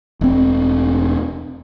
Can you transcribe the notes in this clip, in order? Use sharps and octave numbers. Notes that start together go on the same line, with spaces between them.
E1 C4